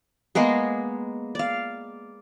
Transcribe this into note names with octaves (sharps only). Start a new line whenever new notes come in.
G#3 A#3 B3 G#4
D5 F5